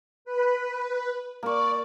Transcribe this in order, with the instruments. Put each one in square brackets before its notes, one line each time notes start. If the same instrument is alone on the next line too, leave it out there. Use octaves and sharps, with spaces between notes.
[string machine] B4
[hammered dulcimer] A#3 C#6 [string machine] D5